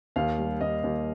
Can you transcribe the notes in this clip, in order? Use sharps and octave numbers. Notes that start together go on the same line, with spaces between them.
D#2 F5
G3
D#2 D#5
D#2